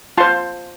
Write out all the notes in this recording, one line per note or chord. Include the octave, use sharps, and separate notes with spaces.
F4 C5 A5 C6